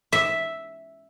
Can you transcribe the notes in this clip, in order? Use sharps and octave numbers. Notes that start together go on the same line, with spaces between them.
E5